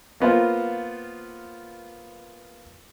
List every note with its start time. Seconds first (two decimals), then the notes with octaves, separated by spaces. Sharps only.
0.20 A#3 B3 F4 C5